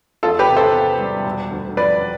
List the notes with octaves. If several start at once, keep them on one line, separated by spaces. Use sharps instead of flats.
E2 F4 A4
G4 B4
C3
A4 C5
B3
G3
E1
D2
F3 B4 D5